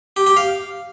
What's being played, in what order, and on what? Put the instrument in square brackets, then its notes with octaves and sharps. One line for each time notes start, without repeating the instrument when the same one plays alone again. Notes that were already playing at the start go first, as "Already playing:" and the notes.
[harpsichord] G4
G4
F5